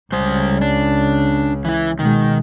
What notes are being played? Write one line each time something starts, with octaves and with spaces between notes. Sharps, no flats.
C#2 C#3 G3 C5
D4
E3 E4
B2 D#3 G#3